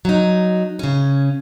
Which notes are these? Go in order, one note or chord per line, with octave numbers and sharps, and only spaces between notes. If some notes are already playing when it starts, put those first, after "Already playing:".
F#3 D#4
C#3 C#4